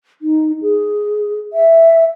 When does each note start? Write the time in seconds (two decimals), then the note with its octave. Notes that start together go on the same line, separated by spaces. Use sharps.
0.22 D#4
0.62 G#4
1.53 E5